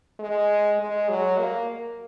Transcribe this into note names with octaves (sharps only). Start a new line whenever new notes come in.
G#3
G#3
F#3
A#3